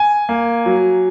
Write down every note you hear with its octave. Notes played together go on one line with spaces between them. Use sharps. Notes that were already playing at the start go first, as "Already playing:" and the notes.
Already playing: G#5
A#3
F#3